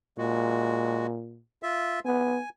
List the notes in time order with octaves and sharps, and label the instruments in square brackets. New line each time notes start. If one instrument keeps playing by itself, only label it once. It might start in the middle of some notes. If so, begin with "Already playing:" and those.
[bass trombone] A#2 [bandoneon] G#3 F#4
[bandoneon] F4 E5
[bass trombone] B3 [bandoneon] G#5